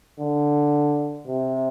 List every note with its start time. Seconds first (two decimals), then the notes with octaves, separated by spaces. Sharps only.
0.20 D3
1.27 C3